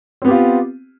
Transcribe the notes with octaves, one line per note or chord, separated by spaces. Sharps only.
B3 C4 F4 G4